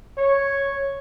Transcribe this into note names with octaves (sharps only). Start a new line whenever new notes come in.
C#5